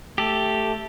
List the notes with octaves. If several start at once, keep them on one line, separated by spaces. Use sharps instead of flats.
A3 G4 A4